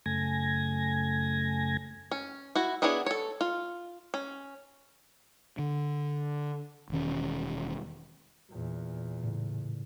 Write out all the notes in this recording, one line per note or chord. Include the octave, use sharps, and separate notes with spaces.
F#2 C#3 A3 G#5 G#6 A#6
C#4
E4 F#4
B3 D4 E4 G#4 C#5
A4 C#5
F4
C#4
D3
E1 D#3 C#4
E2 A#2
A2 C#3